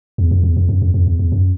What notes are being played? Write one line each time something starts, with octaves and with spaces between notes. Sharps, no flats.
E2
F2
E2
F2
F#2
F2
F2
E2
E2
F#2